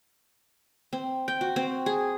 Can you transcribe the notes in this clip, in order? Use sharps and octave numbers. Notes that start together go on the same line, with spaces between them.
C4
G5
F#4
C4
G#4